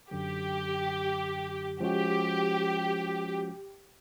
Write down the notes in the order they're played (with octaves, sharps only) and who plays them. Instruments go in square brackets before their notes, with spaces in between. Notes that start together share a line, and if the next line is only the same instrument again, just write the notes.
[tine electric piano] F#2 D3 F#3 [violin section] G4
[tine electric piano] F3 G#3 C#4 F#4 [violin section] G4